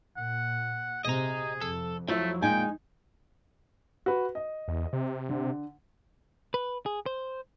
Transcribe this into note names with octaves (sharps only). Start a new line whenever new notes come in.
A#2 F#5
C3 G#4 D#5 A#5
F2 A4
F3 F#3 A3 E4 E5
A#2 G#3 D#4 G5 G#5
F#4 B4
D#5
E2
C3
D3
B4
G#4
C5